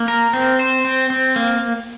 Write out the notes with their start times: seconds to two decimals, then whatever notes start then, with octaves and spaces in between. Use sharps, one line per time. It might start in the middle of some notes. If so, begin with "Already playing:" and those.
Already playing: A#3
0.08 A#4
0.33 C4
0.59 C5
0.85 C4
1.10 C4
1.36 A#3